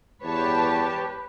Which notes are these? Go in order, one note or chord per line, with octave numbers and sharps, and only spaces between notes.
E2 G4 B4 C#5 A5